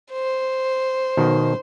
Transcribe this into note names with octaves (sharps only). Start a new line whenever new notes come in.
C5
B2 D#3